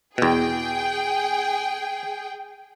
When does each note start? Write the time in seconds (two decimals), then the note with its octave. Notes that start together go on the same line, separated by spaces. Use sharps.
0.18 E2 B2 G#4 G5